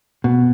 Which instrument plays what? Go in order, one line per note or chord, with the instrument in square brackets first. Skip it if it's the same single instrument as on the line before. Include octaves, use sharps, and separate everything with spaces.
[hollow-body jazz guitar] B2